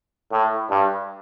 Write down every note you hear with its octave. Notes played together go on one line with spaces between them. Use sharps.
A2
G2